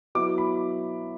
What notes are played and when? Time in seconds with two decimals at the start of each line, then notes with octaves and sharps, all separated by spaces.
0.15 F#3 B3 E4 D6
0.38 B5